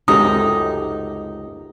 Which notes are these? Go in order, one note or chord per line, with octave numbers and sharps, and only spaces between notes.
C#2 F#2 C3 G#3 D#4 G4 A4 D#6